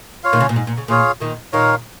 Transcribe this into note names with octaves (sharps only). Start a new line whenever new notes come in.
F4 C#5 F5
A#2 D#3
C#3
A#2
G#2
A#2
C#3
A#2 D#3 F4 G#4 C#5 F5
A#2 D#3
A#2 D#3 D#4 A#4 C#5 F5